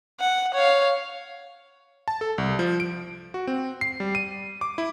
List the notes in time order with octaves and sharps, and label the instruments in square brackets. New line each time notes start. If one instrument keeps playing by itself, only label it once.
[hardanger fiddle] F#5
C#5 F5
[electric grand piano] A5
A4
C2
F3
D7
F#4
C4
C7
G3
D#7
D6
E4